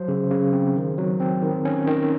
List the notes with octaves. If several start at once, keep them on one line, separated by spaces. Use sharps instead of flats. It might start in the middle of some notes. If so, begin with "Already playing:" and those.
Already playing: F#3 C5
C#3
C#3
C4
D#3
F#3
C4
D#3
C#4
D#3